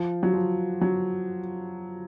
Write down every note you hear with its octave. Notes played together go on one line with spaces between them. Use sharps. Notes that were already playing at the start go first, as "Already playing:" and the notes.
Already playing: F3
F#3
F3
F#3